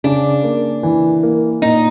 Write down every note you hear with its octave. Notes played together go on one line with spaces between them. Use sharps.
C#3 D4
A#3
E3
A#3
A#2 D#4